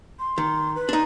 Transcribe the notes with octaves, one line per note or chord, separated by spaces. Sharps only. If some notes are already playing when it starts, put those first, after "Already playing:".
C6
D#3
B4
D4 D#4